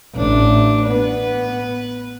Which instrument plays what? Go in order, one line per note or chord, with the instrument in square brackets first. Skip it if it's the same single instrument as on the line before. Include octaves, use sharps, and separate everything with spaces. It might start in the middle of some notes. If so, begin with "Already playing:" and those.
[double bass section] A1 [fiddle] D4
[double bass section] B3 [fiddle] B4